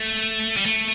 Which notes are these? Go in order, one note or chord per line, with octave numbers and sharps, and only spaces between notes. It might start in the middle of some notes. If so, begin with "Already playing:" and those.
Already playing: A3
G3
A3